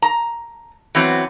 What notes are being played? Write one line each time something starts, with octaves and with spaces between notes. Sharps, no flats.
A#5
E3 F#3 B3 C4